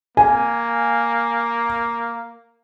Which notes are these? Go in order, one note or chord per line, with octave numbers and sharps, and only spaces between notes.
A#3 G#5